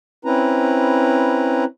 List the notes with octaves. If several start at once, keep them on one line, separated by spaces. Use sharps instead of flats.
C4 C#4 E4 B4 A#5